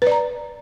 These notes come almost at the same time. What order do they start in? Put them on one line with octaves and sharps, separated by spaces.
B4 D5 A#5